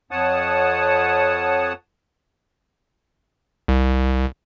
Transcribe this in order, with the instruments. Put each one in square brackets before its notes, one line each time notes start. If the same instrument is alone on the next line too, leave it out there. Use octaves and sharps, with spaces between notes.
[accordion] F2 C#5 F#5 A5 D#6
[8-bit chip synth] C2